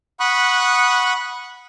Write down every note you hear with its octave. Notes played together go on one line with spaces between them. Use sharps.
F#5 B5 C#6 D#6 F#6